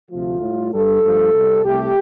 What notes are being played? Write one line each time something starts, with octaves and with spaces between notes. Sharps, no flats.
D2 C3 F3 A3 F4
A2
G3
G2 G3 A4
G2 F3 A3
C2 C3 G3
C2 C3 A3 G4